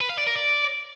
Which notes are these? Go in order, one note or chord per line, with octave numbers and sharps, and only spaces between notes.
B4
F5
D5
A#4
D5